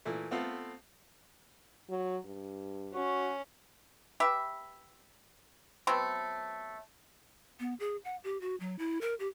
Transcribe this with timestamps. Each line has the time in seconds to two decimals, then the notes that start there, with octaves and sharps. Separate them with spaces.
0.05 A#2 E3 A3
0.31 A3 B3 C4 F4 A4
1.89 F#3
2.25 G2
2.93 C#4 F#4
4.20 G4 B4 E5
5.87 F#3 A3 B3 C4
7.60 B3
7.80 G#4
8.05 F#5
8.24 G4
8.41 F#4
8.60 F#3
8.79 E4
9.01 A#4
9.20 G4